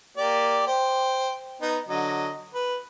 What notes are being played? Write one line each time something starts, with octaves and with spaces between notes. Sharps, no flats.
A#3 G4 D5
C5 G5
B3 D#4
D3 F#3 D#5
B4